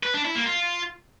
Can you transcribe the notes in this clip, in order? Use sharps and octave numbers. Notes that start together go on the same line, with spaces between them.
B4
D4
E4
A#3
F4